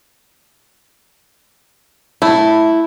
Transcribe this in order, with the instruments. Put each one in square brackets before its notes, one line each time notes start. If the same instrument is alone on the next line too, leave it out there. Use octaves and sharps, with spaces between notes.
[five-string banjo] A3 [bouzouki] E4